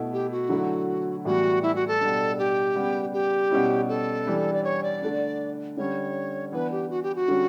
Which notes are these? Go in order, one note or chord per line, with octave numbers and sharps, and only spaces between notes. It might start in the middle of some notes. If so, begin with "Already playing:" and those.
Already playing: B2 A3 E4
G4
F#4
D3 F#3 A3 E4
A2 E3 G3 B3 F#4
E4
F#4
A4
B2 G3 D4
G4
C#3 G3 B3
G4
B2 G3 C#4 E4
A4
E3 G3 D4
D5
C#5
D5
D3 A3 D4
D3 G3 C#4 C#5
E3 B3 D4 B4
G4
F#4
G4
F#4
D3 G3 C#4